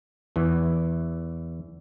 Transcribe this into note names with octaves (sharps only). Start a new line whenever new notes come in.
E2 E3